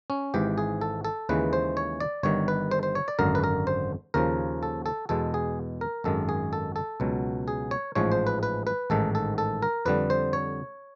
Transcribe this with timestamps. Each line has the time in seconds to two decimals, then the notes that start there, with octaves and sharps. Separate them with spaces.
0.10 C#4
0.34 G#1 G#2 E3 G4
0.58 G#4
0.81 A4
1.05 A4
1.29 D#2 C#3 E3 G#3 B4
1.53 C5
1.77 C#5
2.00 D5
2.23 G1 G2 D#3 C#5
2.48 B4
2.71 C5
2.83 C5
2.95 C#5
3.08 D5
3.19 G#1 F#2 D3 A#4
3.35 B4
3.44 A#4
3.67 C5
4.14 D#2 C#3 F3 A#4
4.63 A4
4.86 A4
5.09 E2 B2 G#3 A4
5.34 G#4
5.81 A#4
6.04 G#1 F#2 D#3 G#3 A4
6.29 G#4
6.53 A4
6.76 A4
7.00 C#2 B2 F#3
7.48 G#4
7.71 C#5
7.95 A1 G#2 F3 G#3 C#5
8.12 C5
8.27 B4
8.43 B4
8.67 B4
8.90 A1 G#2 D#3 A4
9.15 A4
9.38 A4
9.62 A#4
9.85 F2 D3 G3 B4
10.10 C5
10.33 C#5